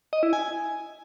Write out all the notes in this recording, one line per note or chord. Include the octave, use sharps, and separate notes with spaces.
D#5
E4
G#5